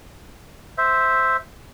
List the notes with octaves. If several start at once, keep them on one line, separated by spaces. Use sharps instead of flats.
C5 E5